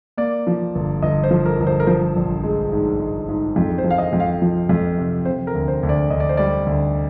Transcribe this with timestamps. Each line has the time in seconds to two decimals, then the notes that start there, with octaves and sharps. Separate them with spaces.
0.17 A#3 D5
0.47 F3
0.75 G1
1.02 G1 D#5
1.24 C5
1.31 F3
1.46 A#4
1.60 G1
1.67 C5
1.80 A#4
1.87 F3 C5
2.16 A#1
2.44 G#3
2.72 G#2
3.00 G#3
3.29 G#2
3.56 F2
3.78 C5
3.84 F3
3.91 F5
3.98 D#5
4.13 F2
4.20 F5
4.42 F3
4.69 F2
4.98 C3
5.25 C3 C5
5.47 A#4
5.55 D2
5.68 C5
5.83 D2
5.89 D5
6.10 D2 D#5
6.20 D5
6.29 C5
6.37 G3 D5
6.66 D2